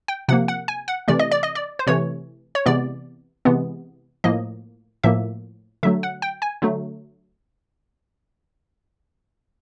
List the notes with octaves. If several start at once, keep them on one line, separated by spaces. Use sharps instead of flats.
G5
C3 F3 A#3 F#5
F#5
G#5
F#5
C3 E3 A3 D5
D#5
D5
D#5
D5
C5
C3 E3 A3 C#5
C#5
C3 E3 G#3 B3 D5
C3 E3 G#3 B3
A2 F3 A#3 D#5
A2 F3 A#3 E5
D3 F#3 A3 E5
F#5
G5
G#5
D3 F#3 A3